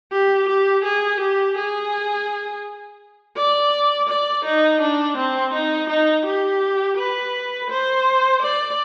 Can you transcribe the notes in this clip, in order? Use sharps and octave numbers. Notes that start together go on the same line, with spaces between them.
G4
G4
G#4
G4
G#4
D5
D5
D#4
D4
C4
D#4
D#4
G4
B4
C5
D5